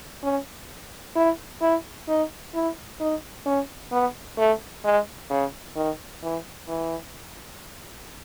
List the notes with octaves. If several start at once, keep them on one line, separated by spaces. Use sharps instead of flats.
C#4
E4
E4
D#4
E4
D#4
C#4
B3
A3
G#3
C#3
D#3
E3
E3